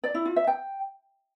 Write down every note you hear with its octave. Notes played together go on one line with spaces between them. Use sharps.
D5
E4
F4
E5
G5